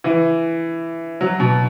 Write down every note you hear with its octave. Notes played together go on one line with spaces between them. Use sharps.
E3
F#3
B2